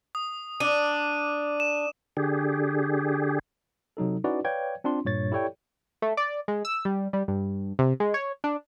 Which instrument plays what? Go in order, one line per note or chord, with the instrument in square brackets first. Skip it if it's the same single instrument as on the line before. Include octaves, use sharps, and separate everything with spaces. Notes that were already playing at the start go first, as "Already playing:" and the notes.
[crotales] D#6
[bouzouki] D4 [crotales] D6 D#7
[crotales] E7
[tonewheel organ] D3 G4 G#4
[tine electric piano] C3 F#3 D#4 A4
C#4 D#4 E4 F#4 B4 D5
B4 C#5 D5 F5 G5 G#6
C4 D4 F4 C6
G2 A#2 C#5 A6
E4 G4 A4 C#5 D5 G5
[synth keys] A3
D5
G#3
E6
G3
G3
G2
C3
G#3
C#5
D4